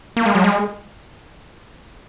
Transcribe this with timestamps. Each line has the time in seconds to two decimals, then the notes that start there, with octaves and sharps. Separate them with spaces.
0.17 A#3
0.26 G#3
0.35 F#3
0.44 G#3